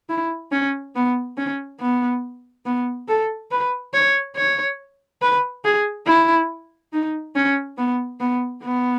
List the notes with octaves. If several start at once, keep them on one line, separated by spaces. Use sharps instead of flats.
E4
C#4
B3
C#4
B3
B3
A4
B4
C#5
C#5
B4
G#4
E4
D#4
C#4
B3
B3
B3